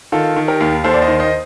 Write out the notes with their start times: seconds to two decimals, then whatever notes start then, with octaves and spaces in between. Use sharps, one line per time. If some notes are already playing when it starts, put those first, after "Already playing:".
0.12 D#3 F4 A4
0.36 D#3
0.48 G4 A#4
0.61 D#2
0.84 D#2 A4 C5
0.94 D5
1.02 C5 D#5
1.08 D#3
1.20 C5 D#5